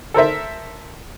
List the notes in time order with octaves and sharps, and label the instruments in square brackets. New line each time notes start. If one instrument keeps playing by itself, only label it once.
[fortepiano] A4 A#4 C5 E5